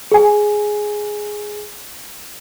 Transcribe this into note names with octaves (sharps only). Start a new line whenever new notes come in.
G#4 G#5